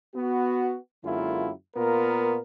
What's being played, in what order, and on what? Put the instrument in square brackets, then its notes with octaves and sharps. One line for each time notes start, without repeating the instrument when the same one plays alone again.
[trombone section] B3 F#4
F#2 D3 G#3 A#3 E4 F4
A#2 B3 F4 A#4